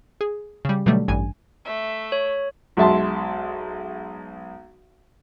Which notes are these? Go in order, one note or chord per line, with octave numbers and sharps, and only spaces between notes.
G#4
C#3 G3
B2 D3 F#3 G3 A3
A1 G2 G#5
A3 E5
C#5
B1 G#3 E5 A5 C6